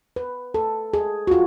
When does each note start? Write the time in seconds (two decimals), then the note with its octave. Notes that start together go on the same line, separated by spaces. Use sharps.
0.16 B4
0.54 A4
0.94 G#4
1.27 F#4
1.31 F4